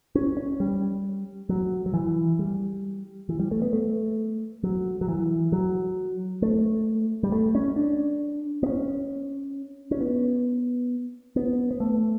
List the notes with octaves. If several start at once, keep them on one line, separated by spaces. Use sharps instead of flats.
C#4
C#4
G3
F#3
F#3
E3
G3
E3
G3
A3
B3
A3
F#3
F#3
E3
F#3
A3
G3
A3
C#4
D4
B3
C#4
C#4
B3
B3
B3
A3